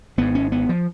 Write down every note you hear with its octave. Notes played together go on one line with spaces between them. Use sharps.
G#1 G#2 B3
C#4
B3
F3